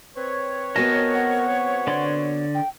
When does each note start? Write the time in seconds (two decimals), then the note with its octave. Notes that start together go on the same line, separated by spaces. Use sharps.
0.16 C4 B4 C#5
0.76 B3 F#4 A#4 D#5 G#5 A5
1.14 F#5
1.87 D3 D5 C6
2.54 G5